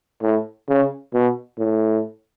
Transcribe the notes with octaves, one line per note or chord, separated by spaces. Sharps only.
A2
C#3
B2
A2